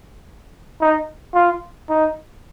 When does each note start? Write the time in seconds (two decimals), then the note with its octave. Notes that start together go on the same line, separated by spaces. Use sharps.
0.81 D#4
1.34 F4
1.89 D#4